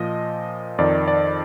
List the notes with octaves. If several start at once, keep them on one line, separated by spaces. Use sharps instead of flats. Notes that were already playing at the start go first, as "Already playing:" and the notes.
Already playing: A#2 F3 D#5
F2 D#3 D5
D5